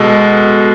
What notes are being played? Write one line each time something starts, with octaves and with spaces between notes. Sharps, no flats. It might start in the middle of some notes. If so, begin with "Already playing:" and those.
Already playing: B2 G#3 A4